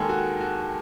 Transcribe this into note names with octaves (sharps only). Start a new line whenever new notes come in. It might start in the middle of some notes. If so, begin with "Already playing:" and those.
Already playing: D#2 D#3 G#3 G#4 A4
F#4
F#4